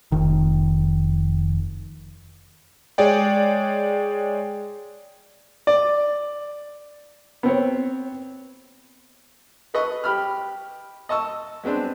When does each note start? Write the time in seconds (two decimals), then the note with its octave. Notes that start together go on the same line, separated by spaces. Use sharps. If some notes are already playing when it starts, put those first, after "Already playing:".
0.12 F1 D#3
2.98 G#3 G#4 C#5 D5 G5
5.67 D5
7.43 B3 C4 C#5
9.74 A4 B4 D#5 C#6
10.04 G4 B5 F6
11.09 D#5 A5 C#6 E6
11.64 G#3 B3 C4 D4